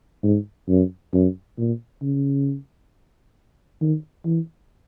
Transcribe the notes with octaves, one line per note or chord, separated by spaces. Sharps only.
G#2
F#2
F#2
A#2
C#3
D#3
E3